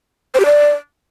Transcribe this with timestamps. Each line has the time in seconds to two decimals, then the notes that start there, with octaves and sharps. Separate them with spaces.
0.34 C5
0.40 G4
0.45 D5